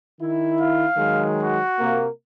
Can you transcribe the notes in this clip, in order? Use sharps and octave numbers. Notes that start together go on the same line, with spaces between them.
D#3 E4
F5
D#3 F#3 G#3
F#4
C3 A#3